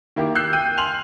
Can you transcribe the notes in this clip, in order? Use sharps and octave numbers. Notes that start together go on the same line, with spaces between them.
D#3 A#3 E4 G4
E6 F#6 G6 C7
G5 G6 D#7
G#5 C6 F6 F7 F#7